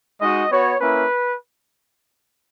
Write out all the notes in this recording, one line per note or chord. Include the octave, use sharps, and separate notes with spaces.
G#3 D#4 F#4 D#5
B3 F#4 C#5
A#3 C#4 E4 B4